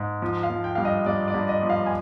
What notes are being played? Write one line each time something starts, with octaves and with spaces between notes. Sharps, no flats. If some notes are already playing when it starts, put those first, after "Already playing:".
Already playing: G#2
F3
F5
F3
G5
G2 F5
D#5
G2 D5
D5
G2
D#5
F3
F5
G#5